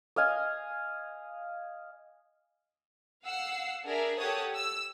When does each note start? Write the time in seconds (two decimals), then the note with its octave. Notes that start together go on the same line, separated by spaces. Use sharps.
0.16 D#5 F5 G#5
3.23 F5 F#5 E6 C7
3.84 D4 G#4 A#4 D5 E5
4.17 G4 A4 C#5 F#5 A5 D#6
4.55 E6